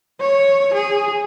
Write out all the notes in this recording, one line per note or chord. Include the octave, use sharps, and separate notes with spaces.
C#5
G#4